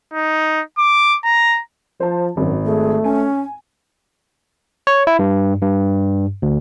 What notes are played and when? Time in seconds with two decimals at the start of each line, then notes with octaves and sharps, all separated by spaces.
0.14 D#4
0.79 D6
1.24 A#5
2.00 F3 C5 A5
2.37 G#1 F#2
2.66 A3 G#4
3.04 C#4 G#5
4.87 C#5
5.07 E4
5.19 G2
5.62 G2
6.42 D2